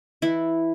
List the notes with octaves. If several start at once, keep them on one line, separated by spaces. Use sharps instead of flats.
E3 E4